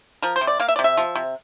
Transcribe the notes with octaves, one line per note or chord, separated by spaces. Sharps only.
F3 A#4
C5
C3
D5
A#3 F5
E5
D5
C3
E5
F3
C3